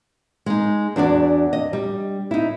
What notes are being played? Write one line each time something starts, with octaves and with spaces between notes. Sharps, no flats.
G#3 D#4
E2 D4 F#4 D5
D#5
G3
D#4 E4